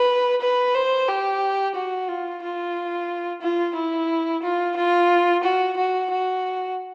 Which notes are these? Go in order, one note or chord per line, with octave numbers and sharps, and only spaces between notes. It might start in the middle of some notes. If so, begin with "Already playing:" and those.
Already playing: B4
B4
C5
G4
F#4
F4
F4
F4
E4
F4
F4
F#4
F#4
F#4